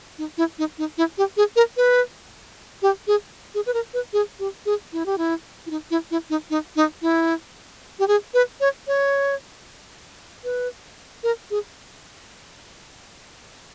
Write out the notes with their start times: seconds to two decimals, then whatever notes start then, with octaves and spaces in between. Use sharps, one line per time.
0.18 D#4
0.38 E4
0.59 D#4
0.78 D#4
0.98 E4
1.18 G4
1.37 G#4
1.56 A#4
1.77 B4
2.82 G4
3.07 G#4
3.55 G#4
3.66 B4
3.74 A#4
3.94 B4
4.13 G#4
4.39 G4
4.66 G#4
4.93 E4
5.06 G4
5.18 E4
5.66 E4
5.71 D#4
5.91 E4
6.11 E4
6.30 D#4
6.50 D#4
6.76 D#4
7.02 E4
7.99 G4
8.08 G#4
8.34 B4
8.61 C#5
8.87 C#5
10.44 B4
11.23 A#4
11.51 G#4